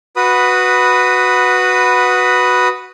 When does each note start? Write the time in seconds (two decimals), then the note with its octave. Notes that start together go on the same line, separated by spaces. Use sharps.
0.16 F#4 B4 B5 D#6